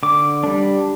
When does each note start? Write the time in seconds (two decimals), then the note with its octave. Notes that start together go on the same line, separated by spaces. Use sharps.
0.03 D3 D6
0.43 G3 D4